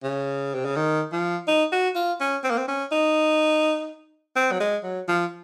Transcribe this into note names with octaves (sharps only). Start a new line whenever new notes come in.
C#3
C3
C#3
D#3
F3
D#4
F#4
F4
C#4
C4
A#3
C4
C#4
D#4
C4
F#3
G#3
F#3
F3